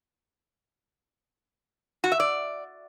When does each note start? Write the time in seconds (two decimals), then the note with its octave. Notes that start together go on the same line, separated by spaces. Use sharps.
2.04 F#4
2.12 E5
2.20 D5